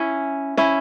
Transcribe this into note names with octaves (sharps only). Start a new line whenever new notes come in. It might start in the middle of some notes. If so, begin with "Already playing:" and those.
Already playing: C#4 E4
C#4 E4